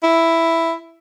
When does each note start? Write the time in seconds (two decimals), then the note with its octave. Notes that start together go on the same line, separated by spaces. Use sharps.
0.03 E4